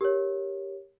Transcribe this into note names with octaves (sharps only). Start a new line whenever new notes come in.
G4 A#4 C#5